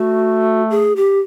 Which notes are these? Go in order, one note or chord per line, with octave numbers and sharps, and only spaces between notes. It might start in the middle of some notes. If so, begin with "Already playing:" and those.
Already playing: A3 F#4
G#4
G4